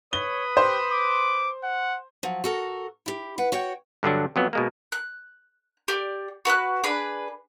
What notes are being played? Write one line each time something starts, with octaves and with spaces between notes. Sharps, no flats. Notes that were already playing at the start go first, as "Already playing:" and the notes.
B4 C#5 B5 D#6 G7
G4 C5
D6
F#5
F3 F#3
F#4 A4 A#4
E4 G4
B4 F#5
F#4 C#5 F#5 G5
G2 D3 F#3 D4
F2 F#3 B3
B2 G#3 A#3
F#6
G4 D5
F#4 B4 D#6 F#6
D4 G#4 B4 B5